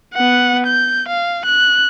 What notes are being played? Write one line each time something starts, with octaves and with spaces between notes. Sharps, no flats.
B3 F#5
G6
F5
F#6